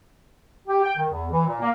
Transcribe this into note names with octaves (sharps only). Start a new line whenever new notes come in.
G4
G5
D#3
E2
E3
A#2
A#3